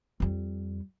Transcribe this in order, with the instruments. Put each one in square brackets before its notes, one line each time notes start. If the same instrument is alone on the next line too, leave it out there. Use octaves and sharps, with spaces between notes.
[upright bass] F2 G3